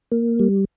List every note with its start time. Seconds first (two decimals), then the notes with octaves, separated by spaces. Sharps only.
0.12 A#3
0.39 G3